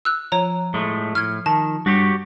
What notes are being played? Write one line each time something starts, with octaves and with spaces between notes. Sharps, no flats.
E6 F#6
F3 C#5 A#5
A2 G#3 A3
A2 F6 G#6
D#3 A5
G2 F#4 G4 C#5 A6